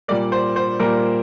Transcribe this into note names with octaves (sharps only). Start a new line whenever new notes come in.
A#2 G3 A#3 D5
C5
C5
A#2 G3 A#3 A#4